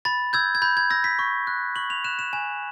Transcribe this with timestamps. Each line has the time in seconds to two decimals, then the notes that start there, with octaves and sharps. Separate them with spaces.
0.05 B5 A6
0.33 E6 G6 G#6
0.55 G#6
0.62 B5 G6
0.77 G#6
0.90 E6 G6 A#6
1.04 B6
1.19 C#6
1.47 F#6
1.76 C#6 F#7
1.90 F7
2.04 F#6 E7
2.19 E7
2.33 G#5 E7